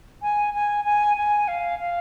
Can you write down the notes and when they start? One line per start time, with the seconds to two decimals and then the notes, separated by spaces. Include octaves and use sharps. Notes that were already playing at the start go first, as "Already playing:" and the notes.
0.22 G#5
0.54 G#5
0.85 G#5
1.17 G#5
1.48 F5
1.79 F5